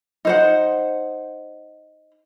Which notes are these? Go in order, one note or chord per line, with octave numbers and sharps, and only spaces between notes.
D#4 C5 F#5